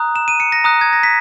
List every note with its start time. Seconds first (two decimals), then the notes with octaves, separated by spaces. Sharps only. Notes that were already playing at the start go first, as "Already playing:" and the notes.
Already playing: A#5 D#6 F#6
0.16 E7
0.28 D#7
0.40 C#7
0.52 A#6
0.64 A#5 D#6 F#6
0.81 G#6
0.93 A#6
1.03 B6